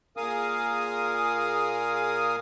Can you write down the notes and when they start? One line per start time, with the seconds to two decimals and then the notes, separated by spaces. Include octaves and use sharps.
0.17 A#2 G#4 A#4 F5 G#5 D#6